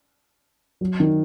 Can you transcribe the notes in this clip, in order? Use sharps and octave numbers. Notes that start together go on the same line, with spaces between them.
F#3
D#3